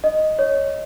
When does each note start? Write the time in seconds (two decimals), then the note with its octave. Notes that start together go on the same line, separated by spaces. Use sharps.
0.04 D#5
0.39 C#5